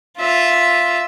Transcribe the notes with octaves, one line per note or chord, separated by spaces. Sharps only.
F4 E5